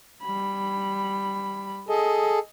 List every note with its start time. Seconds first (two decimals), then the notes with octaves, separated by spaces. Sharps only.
0.23 G3 B5
1.89 G#4 A4 D#5